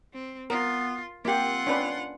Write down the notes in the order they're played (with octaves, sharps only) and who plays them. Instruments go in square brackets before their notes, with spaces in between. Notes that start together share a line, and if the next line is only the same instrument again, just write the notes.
[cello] C4
[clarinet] B3 [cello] F4 [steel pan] A#4
[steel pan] A#3 G4 [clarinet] C4 [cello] F4 F#5
[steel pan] C#4 D4 B4